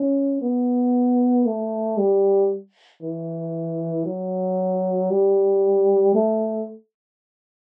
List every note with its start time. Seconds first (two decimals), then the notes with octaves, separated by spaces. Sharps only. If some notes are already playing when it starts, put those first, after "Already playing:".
Already playing: C#4
0.41 B3
1.45 A3
1.97 G3
3.02 E3
4.06 F#3
5.10 G3
6.14 A3